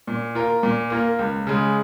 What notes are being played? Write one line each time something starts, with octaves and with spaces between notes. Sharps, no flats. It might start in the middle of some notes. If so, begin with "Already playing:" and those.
A#2
A#3 F4 A#4
A#2
A#3 F4 A#4
C#2
C#3 G#3